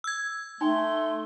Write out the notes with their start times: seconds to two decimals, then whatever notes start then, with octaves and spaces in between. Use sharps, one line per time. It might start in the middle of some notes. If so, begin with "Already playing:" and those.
0.04 E6 G#6
0.61 A3 D#4 G5 G#5 C6